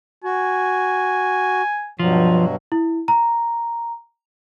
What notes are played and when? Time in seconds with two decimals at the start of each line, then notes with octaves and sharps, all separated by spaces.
0.24 F#4 G#5
1.99 G2 B2 F3 F#3
2.72 E4
3.08 A#5